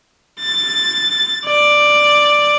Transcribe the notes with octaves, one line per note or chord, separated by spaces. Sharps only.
A6
D5